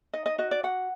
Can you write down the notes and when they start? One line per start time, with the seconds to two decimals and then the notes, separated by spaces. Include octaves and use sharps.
0.13 D#4 D#5
0.26 D#5
0.38 F#4 D#5
0.51 D5
0.63 F#4 F#5